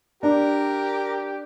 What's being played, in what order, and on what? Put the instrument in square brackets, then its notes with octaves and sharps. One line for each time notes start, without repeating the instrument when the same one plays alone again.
[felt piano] D4 [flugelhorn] G4 [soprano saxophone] A#4